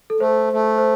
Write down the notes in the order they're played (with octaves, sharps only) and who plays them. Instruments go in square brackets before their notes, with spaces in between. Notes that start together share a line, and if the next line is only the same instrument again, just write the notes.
[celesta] A4
[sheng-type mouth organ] A3 [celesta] C5
[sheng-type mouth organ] A3
[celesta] C5